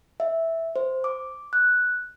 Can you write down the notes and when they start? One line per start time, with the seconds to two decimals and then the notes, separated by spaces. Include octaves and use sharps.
0.20 E5
0.76 C5
1.04 D6
1.53 F#6